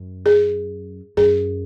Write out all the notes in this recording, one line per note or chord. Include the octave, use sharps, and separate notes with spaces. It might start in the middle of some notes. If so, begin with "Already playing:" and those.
Already playing: F#2
G#4
F#2 G#4